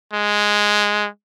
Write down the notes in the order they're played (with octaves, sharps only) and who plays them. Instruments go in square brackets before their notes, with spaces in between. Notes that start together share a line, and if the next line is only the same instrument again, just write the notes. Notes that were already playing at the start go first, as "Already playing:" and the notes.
[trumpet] G#3